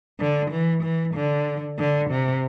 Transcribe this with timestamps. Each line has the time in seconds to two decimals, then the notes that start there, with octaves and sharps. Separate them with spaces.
0.20 D3
0.51 E3
0.83 E3
1.15 D3
1.79 D3
2.10 C3